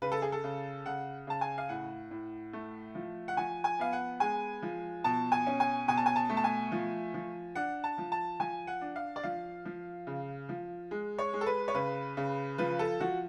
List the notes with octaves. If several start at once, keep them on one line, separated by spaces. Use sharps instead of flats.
C#3 B4
A4
G#4
A4
C#3
C#3 F#5
C#3 A5
G#5
F5
A2 F#5
A2
A3
F3
F#5
F3 G#5
G#5
B3 F5
F#5
G#3 G#5
F3
B2 A5
G#5
C#4
G#5
B2 G#5
A5
G#5
A5
A3
A5
G#5
F3
F3
D4 F#5
A5
F3
A5
F3 G#5
F#5
D4
F5
D5
F3 F5
F3
C#3
F3
G#3
C#5
G#3
A4
B4
C#5
C#3 B4
C#3
F3 B4
A4
F3 F#4